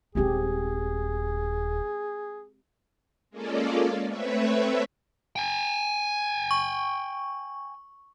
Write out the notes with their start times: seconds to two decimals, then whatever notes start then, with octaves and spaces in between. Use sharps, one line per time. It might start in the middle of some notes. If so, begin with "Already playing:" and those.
0.15 D#1 G#1 G#3 C4 G4 G#4
3.31 G#3 A#3 C#4 F4 A4 D5
4.07 A3 C4 B4 C#5 E5
5.36 G5 G#5
6.51 C#6